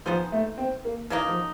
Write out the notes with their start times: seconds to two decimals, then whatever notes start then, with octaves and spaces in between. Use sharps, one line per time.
0.06 F3 B3 D#4 G#4 C5
0.32 A3
0.58 C4
0.85 A#3
1.10 C#3 E3 F#3 A#3 D#4
1.28 F3